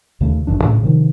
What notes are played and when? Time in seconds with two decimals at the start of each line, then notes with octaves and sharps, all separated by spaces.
0.21 D#2 C#3 A3
0.47 G1 F#2 E3 D4
0.64 A2 C#3
0.83 C3 D#3 F3